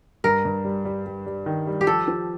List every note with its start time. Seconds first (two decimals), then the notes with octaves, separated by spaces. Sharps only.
0.24 G2 A#4
0.45 G2
0.65 G3
0.85 G3
1.06 G3
1.26 G3
1.46 D#3
1.67 G3
1.81 G4
1.87 F3 A4
2.08 F3